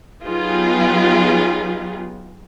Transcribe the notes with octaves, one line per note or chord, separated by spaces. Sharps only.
F#3 B3 D#4 F4 G4 G#4